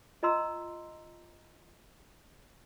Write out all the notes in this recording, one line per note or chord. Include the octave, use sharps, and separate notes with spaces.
F4 D#5 A#5 C6 E6